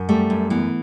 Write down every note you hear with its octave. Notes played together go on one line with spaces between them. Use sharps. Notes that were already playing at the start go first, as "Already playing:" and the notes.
Already playing: F#2
G3 A3
F#2
E3 B3